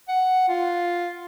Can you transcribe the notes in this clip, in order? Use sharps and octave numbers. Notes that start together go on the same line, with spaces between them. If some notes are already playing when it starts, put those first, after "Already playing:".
F#5
F4